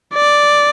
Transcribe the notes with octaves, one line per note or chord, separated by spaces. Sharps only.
D5